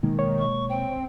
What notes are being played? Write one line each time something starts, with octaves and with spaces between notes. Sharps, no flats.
B2 D#3 G#3 A#3
C#5
C#6
C4 G5